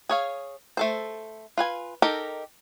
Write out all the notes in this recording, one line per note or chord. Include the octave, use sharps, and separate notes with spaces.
G#4 C#5 F5
A3 A4 C5
F4 B4 G#5
D#4 G4 A4 A#4